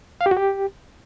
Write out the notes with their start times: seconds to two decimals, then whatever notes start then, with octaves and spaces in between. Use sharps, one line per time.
0.21 F5
0.26 G4
0.31 F#4
0.37 G4